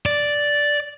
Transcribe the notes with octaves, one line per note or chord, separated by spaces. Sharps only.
D5